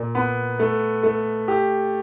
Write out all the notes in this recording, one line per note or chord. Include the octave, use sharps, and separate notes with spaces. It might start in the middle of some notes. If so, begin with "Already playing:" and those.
Already playing: A#2
B3
A3
A3
G4